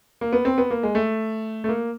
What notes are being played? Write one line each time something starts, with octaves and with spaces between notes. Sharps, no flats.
A#3
B3
C4
B3
A#3
G#3
A3
A3
A#3